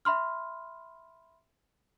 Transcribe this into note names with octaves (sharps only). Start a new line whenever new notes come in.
E5 B5 C6 F6